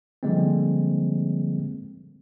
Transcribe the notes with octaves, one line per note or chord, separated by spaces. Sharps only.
D3 F3 G3 G#3 A#3 C4